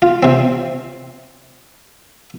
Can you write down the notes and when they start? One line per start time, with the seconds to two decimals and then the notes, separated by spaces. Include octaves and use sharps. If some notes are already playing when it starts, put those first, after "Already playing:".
0.02 F4
0.23 C3 C4